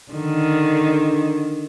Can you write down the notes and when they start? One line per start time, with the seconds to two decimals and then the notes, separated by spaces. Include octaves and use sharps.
0.12 D3 D#3